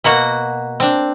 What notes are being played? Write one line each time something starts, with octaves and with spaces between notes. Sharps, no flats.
B2 A#3 F#4 F#5
C4 D4